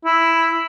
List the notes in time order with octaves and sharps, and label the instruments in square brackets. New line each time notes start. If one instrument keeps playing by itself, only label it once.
[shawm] E4